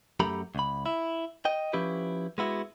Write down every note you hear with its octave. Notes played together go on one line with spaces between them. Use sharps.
F#2 A3 G4 A#5 B5
C#2 B5
E4
D#5 G5
F3 C#4 E4 G4 B4
G#3 B3 E4 F#4